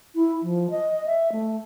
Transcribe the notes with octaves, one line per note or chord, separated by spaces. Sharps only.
E4
F3
D#5
E5
A3